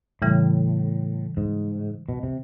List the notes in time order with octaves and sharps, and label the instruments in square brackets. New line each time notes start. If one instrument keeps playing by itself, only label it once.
[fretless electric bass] A2 [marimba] C#3 E3 G3
[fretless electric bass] G#2
B2
C3